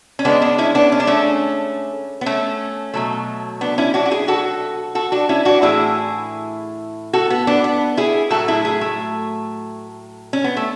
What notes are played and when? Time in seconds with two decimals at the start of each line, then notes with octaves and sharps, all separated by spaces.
0.19 C#4
0.25 C#3 G#3 B3 D4
0.42 B3 D4
0.58 C#4 E4
0.75 B3 D4
0.92 C#4
1.00 D4
1.07 A3 C#4
2.21 B3
2.26 A3 C#4
2.94 B2 F#3 A3
3.61 B3 D4
3.78 C#4 E4
3.94 D4 F#4
4.05 F#4
4.11 E4 G#4
4.28 F#4 A4
4.95 F#4 A4
5.12 D4 F#4
5.29 C#4 E4
5.45 D4 F#4
5.62 A2 E3 A3 E4 G#4
7.13 F#4 A4
7.30 B3
7.47 B3 D4
7.64 B3
7.97 E4 G#4
8.30 A2 F#3 A3 F#4 A4
8.48 E4 G#4
8.65 E4 G#4
8.81 A3
10.33 C#4
10.44 B3
10.57 A3